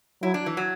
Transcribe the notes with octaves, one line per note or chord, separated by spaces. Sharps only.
F#3 E4
D4
E3
F#3